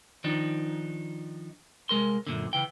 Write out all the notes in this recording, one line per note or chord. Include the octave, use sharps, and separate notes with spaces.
D#3 F3 D4 D#4
C2 G#3 A#4 C6
F#2 A#2 D3
C#3 E3 G5